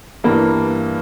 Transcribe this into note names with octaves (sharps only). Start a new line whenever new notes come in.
G2 E3 G3 A#3